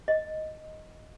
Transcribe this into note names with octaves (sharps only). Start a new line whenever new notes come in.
D#5